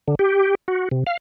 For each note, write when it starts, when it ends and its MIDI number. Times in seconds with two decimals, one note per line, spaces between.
0.08 0.15 50
0.19 0.55 67
0.68 0.89 66
0.91 1.04 48
1.07 1.17 77